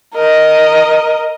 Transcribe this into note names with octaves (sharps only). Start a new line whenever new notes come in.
A#4 D#5